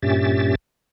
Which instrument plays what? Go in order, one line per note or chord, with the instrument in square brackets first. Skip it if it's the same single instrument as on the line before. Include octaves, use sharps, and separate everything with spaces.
[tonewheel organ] G2 A#2 C#4 G4 E5 A6